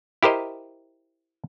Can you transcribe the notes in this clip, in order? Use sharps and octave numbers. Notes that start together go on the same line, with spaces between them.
E4 G4 A#4 C5 D#5